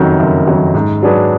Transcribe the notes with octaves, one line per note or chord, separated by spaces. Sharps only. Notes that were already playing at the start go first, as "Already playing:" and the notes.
Already playing: F#1 F2 D#3 F#3
F#1
F2 D#3 F#3
G#2
F#3 D4 G#4 B4